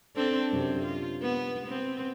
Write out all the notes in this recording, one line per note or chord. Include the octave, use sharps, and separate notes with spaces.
C4 D4 A4
F#2 C3 C4
F4
B3
B3 C4